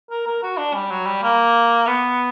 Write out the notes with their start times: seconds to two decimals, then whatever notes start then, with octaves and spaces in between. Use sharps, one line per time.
0.10 A#4
0.27 A#4
0.43 F#4
0.58 D4
0.75 G3
0.91 F#3
1.06 G3
1.23 A#3
1.87 B3